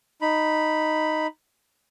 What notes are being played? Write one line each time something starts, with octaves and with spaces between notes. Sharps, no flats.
D#4 B5